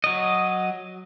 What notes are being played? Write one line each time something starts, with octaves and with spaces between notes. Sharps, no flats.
F#3 D#5